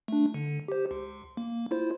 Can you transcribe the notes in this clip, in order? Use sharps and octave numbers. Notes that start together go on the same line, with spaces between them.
A3 D4
D3
G4 C5
C#2
A#3
E4 F4 C5